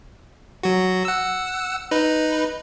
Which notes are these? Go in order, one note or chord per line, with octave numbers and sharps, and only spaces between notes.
F#3 F#4
F#5 E6
D#4 B4